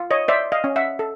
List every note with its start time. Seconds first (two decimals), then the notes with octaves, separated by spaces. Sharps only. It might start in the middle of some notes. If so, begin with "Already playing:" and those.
Already playing: F4
0.11 C#5 D#5
0.28 C5 D5 E5
0.52 D#5 F5
0.64 C#4
0.76 E5 F#5
0.99 A4